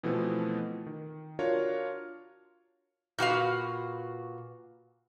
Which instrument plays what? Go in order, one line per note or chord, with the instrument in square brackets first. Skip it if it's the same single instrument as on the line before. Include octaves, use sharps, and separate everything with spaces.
[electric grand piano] B2 E3 F3 A3 B3 C4
D#3
D4 F4 F#4 A#4 C#5 F5
[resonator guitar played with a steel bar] A#2 F#4 B4 F5